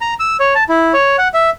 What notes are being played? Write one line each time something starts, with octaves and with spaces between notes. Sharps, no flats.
A#5
E6
C#5
A5
E4
C#5
F#5
E5